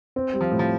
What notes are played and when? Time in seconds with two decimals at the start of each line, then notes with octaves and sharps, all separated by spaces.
0.16 C4
0.33 G3
0.41 F3
0.51 A2
0.59 F3